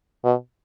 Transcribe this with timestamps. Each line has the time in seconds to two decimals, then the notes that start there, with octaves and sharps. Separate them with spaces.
0.24 B2